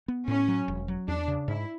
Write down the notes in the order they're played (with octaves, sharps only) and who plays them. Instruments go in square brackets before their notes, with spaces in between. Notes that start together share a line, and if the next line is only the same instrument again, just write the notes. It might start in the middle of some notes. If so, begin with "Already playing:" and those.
[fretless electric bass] B3
[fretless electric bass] A2 [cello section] C#4
[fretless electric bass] F#3
E1
F#3
[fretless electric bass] E2 [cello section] D4
[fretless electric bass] C#3
[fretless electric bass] G#2 [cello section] E4